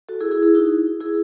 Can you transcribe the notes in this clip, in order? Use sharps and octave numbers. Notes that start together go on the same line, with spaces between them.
F#4 A4
E4 G#4
E4 G#4
E4 G#4
D#4 F#4
E4 G#4